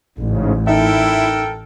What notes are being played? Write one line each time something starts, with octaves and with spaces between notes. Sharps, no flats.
A1 G#2 C#3
D#4 E4 A4 A#4 E5 G5